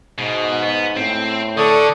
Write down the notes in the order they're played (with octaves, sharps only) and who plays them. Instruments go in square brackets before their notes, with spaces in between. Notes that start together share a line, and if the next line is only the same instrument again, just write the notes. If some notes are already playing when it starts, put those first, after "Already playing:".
[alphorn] G#2 [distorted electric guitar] B2
[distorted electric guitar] B3
[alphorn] A2 [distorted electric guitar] C4
[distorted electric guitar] D3 [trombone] A4 [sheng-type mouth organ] D5 C#6 D#6